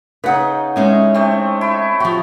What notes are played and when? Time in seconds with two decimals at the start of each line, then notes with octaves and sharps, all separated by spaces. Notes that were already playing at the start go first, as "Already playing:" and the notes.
0.24 C#3 D#4 B4 F#5
0.76 A2 G#3 C#4 G#4
1.14 A3 C4
1.61 E4
2.00 F3 F#4 G4